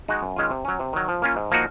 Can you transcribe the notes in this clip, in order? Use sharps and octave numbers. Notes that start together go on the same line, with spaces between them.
G#3 D#4 F#4
F#2
D#3 G#3 C#4 F4
C3
F#3 C#4
C3
D#3 F#3
F3
A#3 C#4 F4
G#2
F3 A#3 D#4 F#4